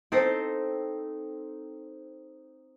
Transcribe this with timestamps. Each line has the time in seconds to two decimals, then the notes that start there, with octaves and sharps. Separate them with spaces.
0.12 C4 D#4 A4 C5